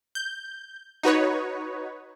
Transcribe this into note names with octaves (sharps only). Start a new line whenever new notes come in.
G6
D#4 F#4 B4 C#5